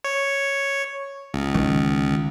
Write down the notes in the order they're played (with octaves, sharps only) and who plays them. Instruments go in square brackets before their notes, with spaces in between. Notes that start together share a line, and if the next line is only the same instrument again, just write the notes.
[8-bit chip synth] C#5
C#2
[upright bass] D#3